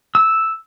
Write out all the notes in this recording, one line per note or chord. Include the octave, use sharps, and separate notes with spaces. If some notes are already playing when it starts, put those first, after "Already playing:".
E6